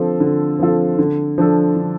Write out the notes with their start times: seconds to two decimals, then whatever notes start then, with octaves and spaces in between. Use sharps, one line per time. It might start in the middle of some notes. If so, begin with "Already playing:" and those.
Already playing: D3 F3 C4 F4 A4
0.20 D3
0.59 F3 C4 F4 A4
0.99 D3
1.38 F3 D4 A4
1.76 D3